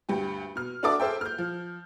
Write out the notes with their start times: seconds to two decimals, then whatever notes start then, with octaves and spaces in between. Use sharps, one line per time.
0.09 D2 G2 G4
0.55 B2 F6
0.83 D4 F#4 A4 D5 E5 D6
1.00 G#4 A4 C5 E5 G5
1.21 F6 G6
1.38 F3